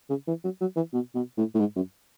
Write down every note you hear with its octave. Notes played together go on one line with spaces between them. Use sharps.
C#3
E3
F#3
F#3
E3
B2
B2
A2
A2
G#2
F#2